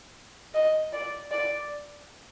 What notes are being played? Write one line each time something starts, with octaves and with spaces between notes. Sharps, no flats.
D#5
D5
D5